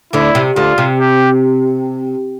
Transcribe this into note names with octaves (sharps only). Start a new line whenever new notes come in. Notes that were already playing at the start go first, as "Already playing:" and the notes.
D2 D3 E4
C3
D2 D3 F4
C3
G4